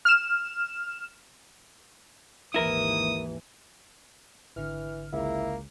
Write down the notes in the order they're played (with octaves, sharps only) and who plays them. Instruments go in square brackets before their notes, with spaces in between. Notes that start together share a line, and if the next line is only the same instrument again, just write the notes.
[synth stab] F6 E7
[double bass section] G#1 D#2 E3 [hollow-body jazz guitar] E4 A#4 [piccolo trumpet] D#6
[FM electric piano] G#1 D3 [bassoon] E3 [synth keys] F6
[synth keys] C#2 C#3 [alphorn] A#3 [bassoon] E4